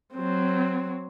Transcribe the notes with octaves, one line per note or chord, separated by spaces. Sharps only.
F#3 C4